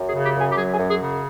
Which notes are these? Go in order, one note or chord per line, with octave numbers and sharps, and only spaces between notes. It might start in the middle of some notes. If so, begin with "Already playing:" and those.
Already playing: F#2
G#4
C#3
G4
F#2 G#4
G4
F#3 G#4
G#4
F#2
G#4
C#3